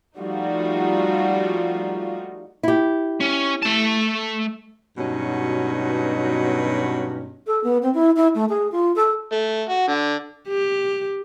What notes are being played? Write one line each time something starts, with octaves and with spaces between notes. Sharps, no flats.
F3 G3 A3 D#4 F4 F#4
E4 G4
C#4
A3 A5
G2 B2 F#3 C#4 D#4
A4
B3
C4
E4
E4
A3
G#4
F4
A4
A3
F#4
D3
G4